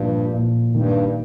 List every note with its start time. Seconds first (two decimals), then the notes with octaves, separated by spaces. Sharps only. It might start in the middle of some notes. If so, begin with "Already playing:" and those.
Already playing: G2 A#2 F3
0.34 A#2
0.75 G2 D#3